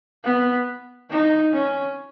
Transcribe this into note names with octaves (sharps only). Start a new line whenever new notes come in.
B3
D#4
C#4